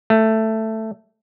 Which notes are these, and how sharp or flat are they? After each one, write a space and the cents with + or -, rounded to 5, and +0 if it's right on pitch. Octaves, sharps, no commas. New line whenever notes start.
A3 +5